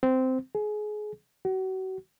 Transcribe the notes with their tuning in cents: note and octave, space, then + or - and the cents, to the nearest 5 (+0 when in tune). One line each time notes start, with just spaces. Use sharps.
C4 -15
G#4 +25
F#4 +35